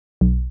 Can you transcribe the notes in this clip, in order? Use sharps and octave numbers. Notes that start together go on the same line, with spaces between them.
B1